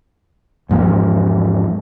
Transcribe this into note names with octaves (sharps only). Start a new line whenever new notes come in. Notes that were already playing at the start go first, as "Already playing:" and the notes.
E1 G#2 F3 A#3